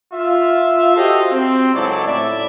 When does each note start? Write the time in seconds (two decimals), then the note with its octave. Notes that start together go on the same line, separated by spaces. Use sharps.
0.14 F4 E5
0.96 F#4 G4 A4 C5 D#5 F5
1.32 C4
1.75 C#2 G#2 F#3 E4 A4 D5
2.07 A2 D5 E5